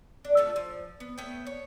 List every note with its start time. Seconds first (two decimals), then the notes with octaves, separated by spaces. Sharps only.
0.25 D4
0.37 A3 D4 F4 A4
0.56 F3
1.00 B3
1.18 A3 B3 C#5 G5
1.47 C#5